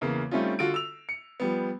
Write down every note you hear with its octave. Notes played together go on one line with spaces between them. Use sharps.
E2 C#3 E3 A#3
G3 A3 C4 C#4 D#4 F4
D3 F4 F#4 A4 D7
E6 F7
C#7
F3 G3 B3